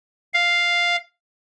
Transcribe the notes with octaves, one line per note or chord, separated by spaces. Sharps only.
F5